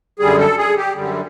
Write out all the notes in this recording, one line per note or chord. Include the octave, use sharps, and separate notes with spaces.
F#2 D3 G3 G#4
A4
G#4
G4
F#2 D3 G3